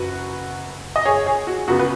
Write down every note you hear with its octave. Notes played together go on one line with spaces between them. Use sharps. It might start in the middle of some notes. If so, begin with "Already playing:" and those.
Already playing: F#1 F#2 F#4 B4
D#5
G#4 C#5
G#4 C#5
F#4
C#2 C#3 B3 F#4
B4